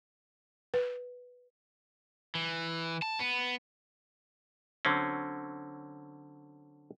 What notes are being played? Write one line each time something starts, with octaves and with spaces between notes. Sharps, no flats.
B4
E3
A5
B3
D3 F#3 C4 C#4